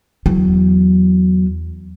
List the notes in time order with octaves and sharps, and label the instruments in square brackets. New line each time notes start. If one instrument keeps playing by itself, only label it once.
[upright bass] E2 F#3